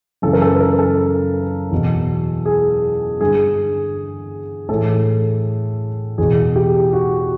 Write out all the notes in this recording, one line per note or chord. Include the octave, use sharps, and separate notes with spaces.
F#2 C#3 E3 A4
A#4
A4
B4
A#4
A4
E2 B2
G#4
G2 D3 G#4
A2 E3 A4
E2 B2 G#4
G4
F#4